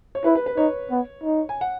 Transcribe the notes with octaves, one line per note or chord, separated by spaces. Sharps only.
C#5
E4 B4
B4
B4
D#4 C#5
B3
D#4
G#5
F#5